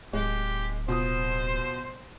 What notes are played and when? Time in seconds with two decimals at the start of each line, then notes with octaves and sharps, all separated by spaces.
0.13 D1 G#3 G4
0.88 B2 F4 C5 D#6